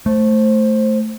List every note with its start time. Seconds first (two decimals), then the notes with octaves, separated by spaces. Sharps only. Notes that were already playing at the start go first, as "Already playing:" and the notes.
0.06 A3 C5